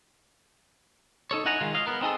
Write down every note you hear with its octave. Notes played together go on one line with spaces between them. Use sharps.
D#4 A4 C#5
D#4 E4 F#5 G#5 A#5
D#3 G#3 D#4 F4
C#5 D#5 F5
B3 A#4
C4 D#4 G#4 A4